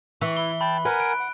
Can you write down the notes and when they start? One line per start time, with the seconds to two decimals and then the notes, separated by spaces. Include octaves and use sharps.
0.21 E3 C#6
0.37 E4 G7
0.61 G5 A5 B5
0.85 A#4 B4 F#5 G#5
1.00 F#6 D7
1.20 F#5